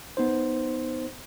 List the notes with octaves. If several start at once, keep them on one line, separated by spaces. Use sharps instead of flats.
B3 D#4 C5